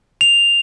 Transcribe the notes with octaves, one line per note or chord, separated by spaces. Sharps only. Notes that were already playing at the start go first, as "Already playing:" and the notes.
F7